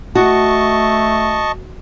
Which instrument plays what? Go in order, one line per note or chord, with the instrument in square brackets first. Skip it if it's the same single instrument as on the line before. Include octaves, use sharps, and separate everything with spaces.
[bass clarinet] A3 [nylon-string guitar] F#4 [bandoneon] D#5 A5 C#6